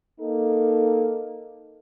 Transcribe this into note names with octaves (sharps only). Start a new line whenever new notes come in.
A#3 D#4 A4